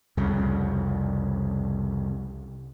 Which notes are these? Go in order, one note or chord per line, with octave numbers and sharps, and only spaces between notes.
C2 F2 C#3